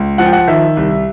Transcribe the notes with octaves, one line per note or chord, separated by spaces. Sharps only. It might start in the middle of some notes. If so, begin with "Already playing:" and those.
Already playing: C#2
F3 F#5
G5
F#5
D#3 E5
C2